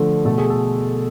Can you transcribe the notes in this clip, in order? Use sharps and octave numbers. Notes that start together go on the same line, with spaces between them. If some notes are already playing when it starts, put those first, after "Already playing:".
Already playing: D3 F3 A3
B2 A3 A4
G#4
A4